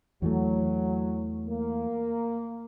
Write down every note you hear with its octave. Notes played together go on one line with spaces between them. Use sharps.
E2 E3 F#3 A3
A#3